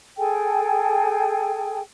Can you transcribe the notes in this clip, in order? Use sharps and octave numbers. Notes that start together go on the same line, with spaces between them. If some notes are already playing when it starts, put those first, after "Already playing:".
G#4 A4 G5 G#5